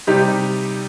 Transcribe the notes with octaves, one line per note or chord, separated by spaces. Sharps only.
C3 G3 D#4 G4